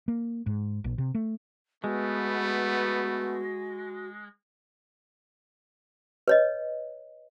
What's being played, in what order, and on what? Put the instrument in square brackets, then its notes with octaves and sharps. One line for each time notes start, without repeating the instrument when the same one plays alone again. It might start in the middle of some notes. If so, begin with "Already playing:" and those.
[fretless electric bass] A#3
G#2
A#1
C3
A3
[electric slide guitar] G#3 [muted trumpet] A3 [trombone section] B3 [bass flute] F#4
[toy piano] B4 C#5 D#5